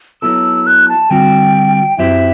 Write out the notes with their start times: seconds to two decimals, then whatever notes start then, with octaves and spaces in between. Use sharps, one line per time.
0.22 F#3 B3 E4 A4 E6
0.67 F#6
0.89 A5
1.10 D3 G3 C4 F#4 G5
1.98 F#2 F#3 C4 E4 G4 E5